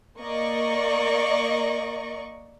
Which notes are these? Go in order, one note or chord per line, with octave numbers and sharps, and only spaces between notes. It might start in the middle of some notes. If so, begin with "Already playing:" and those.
A#3 D5 D#5 C#6